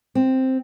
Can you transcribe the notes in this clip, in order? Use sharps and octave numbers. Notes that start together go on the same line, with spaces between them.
C4